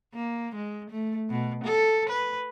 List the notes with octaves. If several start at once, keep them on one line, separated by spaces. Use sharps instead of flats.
A#3
G#3
A3
B2
A4
B4